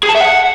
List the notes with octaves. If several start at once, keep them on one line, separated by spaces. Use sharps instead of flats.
G#4
A5
E5
F#5